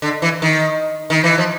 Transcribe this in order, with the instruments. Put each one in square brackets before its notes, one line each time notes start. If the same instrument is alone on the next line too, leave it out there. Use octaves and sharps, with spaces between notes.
[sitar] D3
E3
D#3
D#3
E3
F3